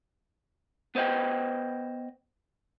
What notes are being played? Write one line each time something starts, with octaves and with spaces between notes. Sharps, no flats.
B3 B4 C5 D#5 G5